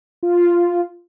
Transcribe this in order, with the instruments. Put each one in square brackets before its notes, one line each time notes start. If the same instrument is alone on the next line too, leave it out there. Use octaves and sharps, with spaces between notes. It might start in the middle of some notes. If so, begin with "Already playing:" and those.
[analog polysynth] F4